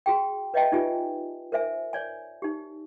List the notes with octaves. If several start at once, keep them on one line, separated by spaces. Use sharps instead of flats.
F#4 G#4 G5
B4 C#5 D#5 E5 G5 A5
D#4 F4 G4 D5 G#5
A#4 C5 E5 G#5
C#5 D5 G#5
D#4 G4